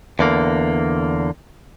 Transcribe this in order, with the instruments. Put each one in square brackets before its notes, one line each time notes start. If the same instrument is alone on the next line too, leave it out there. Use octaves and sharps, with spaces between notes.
[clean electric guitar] E2 D3 A#3